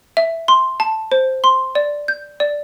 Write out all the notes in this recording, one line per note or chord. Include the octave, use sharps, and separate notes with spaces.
E5
C6
A5
C5
C6
D5
G6
D5